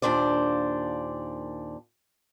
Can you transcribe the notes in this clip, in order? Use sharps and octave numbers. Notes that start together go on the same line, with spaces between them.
D#2 A#2 D4 C5 D5